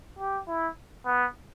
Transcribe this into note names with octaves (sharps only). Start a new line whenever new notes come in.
G4
E4
B3